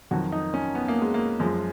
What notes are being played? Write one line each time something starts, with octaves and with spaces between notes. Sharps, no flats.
F2 D#3 F#3 F#4
D#4
C#4
B3
A#3
G#3
A#3
F#2 F3 G#3